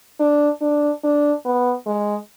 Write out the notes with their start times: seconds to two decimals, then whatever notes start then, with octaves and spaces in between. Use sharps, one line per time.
0.20 D4
0.61 D4
1.04 D4
1.45 B3
1.87 G#3